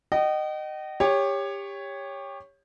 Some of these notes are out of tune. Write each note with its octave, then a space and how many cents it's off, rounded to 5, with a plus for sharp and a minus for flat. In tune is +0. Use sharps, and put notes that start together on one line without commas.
D#5 -20 G5 -45
G4 +25 C#5 +0